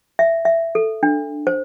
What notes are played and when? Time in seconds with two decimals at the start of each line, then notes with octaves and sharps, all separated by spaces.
0.19 E5
0.45 E5
0.75 A4
1.03 D4
1.47 C5